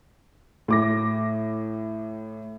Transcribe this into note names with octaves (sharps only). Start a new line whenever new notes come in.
A2 D6 A#6